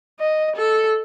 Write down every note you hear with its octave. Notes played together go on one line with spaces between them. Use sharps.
D#5
A4